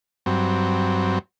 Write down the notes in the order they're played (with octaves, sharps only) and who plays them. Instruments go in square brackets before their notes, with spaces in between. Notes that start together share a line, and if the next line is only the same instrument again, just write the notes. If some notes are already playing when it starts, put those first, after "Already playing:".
[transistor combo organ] G2 F#3 C4